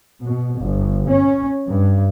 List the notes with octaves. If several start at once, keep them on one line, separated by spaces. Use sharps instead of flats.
B2
G1
C#4
G2